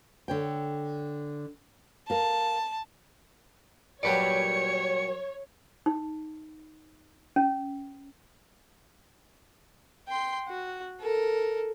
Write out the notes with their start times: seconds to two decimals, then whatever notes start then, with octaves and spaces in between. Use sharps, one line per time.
0.28 D3 C#5 G5
2.10 A#4 F5 A5
4.03 A#2 F#3 G3 G4 B4 C#5 D5 C#7
5.86 D#4
7.36 C#4
10.08 G5 C6
10.48 F#4
11.00 A4 A#4